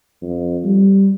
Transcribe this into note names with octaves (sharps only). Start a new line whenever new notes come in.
F2
G3